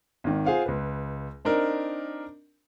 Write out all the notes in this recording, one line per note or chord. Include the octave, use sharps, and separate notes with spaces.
G#1 D#3
F4 G#4 C5 F5 F#5
C#2 B4
C4 D4 D#4 A#4